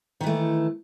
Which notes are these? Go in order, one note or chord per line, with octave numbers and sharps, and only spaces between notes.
D#3 E3 A3